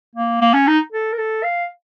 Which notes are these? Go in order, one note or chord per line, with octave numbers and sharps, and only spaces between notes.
A#3
A#3
C#4
D#4
A4
A#4
A4
F5